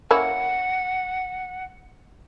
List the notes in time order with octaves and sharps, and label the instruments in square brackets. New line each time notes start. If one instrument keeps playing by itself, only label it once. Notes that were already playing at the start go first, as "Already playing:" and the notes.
[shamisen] A#3 C#4 E4 [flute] F#5